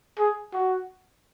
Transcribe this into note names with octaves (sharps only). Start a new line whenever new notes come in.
G#4
F#4